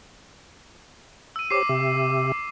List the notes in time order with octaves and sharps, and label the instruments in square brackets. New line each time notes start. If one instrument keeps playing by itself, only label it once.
[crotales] E6 D#7
[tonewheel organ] G4 C5 C#5 [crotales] D6 C7
[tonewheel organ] C3 G4 E5